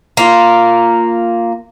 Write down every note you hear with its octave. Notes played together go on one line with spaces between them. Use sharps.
A#3 F4